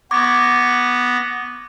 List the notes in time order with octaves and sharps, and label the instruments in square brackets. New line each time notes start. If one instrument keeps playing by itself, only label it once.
[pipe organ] B3 A#6 [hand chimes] C#6 D6 G#6